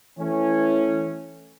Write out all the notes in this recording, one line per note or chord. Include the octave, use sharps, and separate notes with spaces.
E3 A3 C#4